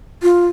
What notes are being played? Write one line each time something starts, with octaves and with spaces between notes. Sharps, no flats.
F4